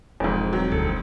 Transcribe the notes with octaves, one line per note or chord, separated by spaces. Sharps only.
E1 F2 G#2
F#3 C4
D2 A4